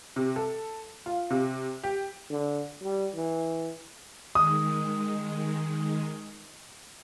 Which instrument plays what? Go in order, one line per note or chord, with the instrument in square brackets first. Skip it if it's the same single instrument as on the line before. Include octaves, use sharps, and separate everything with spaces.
[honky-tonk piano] C3
A4
F4
C3
G4
[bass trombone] D3
G3
E3
[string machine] D#3 G#3 [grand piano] D#6